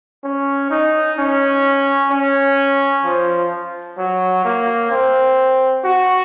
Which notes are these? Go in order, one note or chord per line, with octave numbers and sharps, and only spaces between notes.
C#4
D#4
C#4
C#4
F3
F#3
A#3
C4
F#4